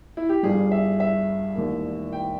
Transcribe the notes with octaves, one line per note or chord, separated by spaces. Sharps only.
E4
G4
G1 G2 G3 G#4
E5
E5
E1 D#2 D#3 A#3
G5